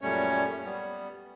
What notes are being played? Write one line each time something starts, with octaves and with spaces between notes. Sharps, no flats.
F#2 A#2 G3 A3 C#4 C#5
G3 B3